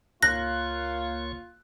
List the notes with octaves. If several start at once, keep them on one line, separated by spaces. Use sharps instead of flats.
C#2 C#3 A#3 F4 C#5 F#6 A#6